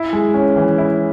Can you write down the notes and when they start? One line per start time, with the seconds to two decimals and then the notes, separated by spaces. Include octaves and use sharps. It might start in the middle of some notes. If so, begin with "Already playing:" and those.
Already playing: E4
0.13 G#3
0.34 C#4
0.56 E3
0.78 E4